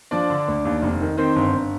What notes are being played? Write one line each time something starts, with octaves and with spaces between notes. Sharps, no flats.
F3 D4 D5
D3
D2
D#2
F1
D#3
D#3 C4 C5
G1
G1